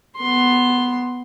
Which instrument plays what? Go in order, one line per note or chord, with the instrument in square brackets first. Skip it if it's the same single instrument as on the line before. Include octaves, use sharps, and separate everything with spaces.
[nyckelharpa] B3 C6